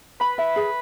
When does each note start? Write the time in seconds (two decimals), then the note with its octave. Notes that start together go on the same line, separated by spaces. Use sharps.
0.20 B4 B5
0.38 E5
0.56 G#4